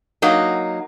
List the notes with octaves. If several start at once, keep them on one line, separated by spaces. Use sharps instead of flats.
F#3 A#3 D#4